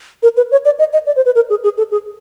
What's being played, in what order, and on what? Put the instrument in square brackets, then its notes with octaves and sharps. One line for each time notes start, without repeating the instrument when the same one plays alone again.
[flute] A#4
B4
C#5
D5
D#5
D#5
D5
C5
B4
A#4
G#4
G#4
A4
G#4